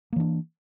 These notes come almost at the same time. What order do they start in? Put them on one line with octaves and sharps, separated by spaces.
A#3 E3 D4